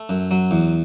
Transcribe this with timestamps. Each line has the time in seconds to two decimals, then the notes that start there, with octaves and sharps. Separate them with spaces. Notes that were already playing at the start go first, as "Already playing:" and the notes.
Already playing: A3
0.09 F#2
0.31 F#3
0.51 E2